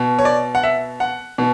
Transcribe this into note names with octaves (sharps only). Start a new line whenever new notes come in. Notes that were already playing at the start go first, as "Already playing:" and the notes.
Already playing: B2
C#5
D5
F#5
E5
F#5
B2